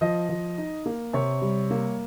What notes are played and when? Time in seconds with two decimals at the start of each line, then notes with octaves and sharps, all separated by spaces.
0.01 F3 D#5
0.29 F3
0.58 D#4
0.86 A#3
1.13 C3 C#5
1.41 G3
1.71 A#3